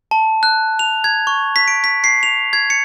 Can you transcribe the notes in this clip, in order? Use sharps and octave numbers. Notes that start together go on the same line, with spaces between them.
A5
F#6
F7
G#6
C#6
B6
D7
B6
C7
F7
G#6
C#7